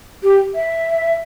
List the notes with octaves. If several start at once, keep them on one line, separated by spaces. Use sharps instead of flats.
G4
E5